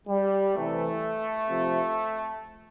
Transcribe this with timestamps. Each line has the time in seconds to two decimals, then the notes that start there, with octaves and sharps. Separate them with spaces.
0.08 G3
0.55 C3 E3 A3
1.48 C3 F3